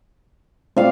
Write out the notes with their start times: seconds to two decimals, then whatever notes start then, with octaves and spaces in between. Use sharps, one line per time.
0.77 A3 C4 F4 D5 F5